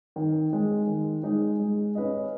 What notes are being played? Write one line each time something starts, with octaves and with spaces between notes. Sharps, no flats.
D#3
G#3 D#4
D#3
G#3 D#4
G#3
C#4 B4 D#5